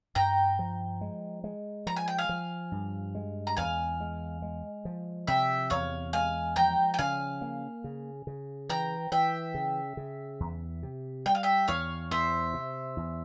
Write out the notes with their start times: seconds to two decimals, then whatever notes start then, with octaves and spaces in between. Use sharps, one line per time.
0.15 G2 G5 A#5
0.59 F3
1.01 G#3
1.44 G#3
1.87 F3 A#5
1.96 G#5
2.08 G5
2.18 F5 G#5
2.29 F3
2.72 G2
3.15 G#3
3.47 A#5
3.57 E2 F5 G#5
4.00 G#3
4.42 G#3
4.85 F3
5.27 C3 E5 G5
5.70 E2 C#5 F5
6.13 G#3 F5 G#5
6.56 F3 G5 A#5
6.94 G5
6.99 C#3 F5 G#5
7.42 A#3
7.84 C#3
8.27 C#3
8.69 E3 G5 A#5
9.12 E3 E5 G5
9.55 C#3
9.97 C#3
10.40 E2
10.83 C3
11.26 G3 G5
11.35 F5
11.43 E5 G5
11.68 E2 C#5 F5
12.11 E2 C5 E5
12.54 C3
12.97 E2